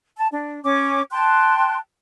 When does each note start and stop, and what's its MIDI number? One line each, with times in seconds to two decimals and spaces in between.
0.17 0.26 81
0.31 0.63 62
0.64 1.02 61
0.64 1.02 73
0.64 1.02 86
1.11 1.77 79
1.11 1.77 81
1.11 1.77 84
1.11 1.77 90